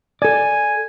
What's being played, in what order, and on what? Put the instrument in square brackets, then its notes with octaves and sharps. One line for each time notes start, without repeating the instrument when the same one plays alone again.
[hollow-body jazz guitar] A4 D5 [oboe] G#5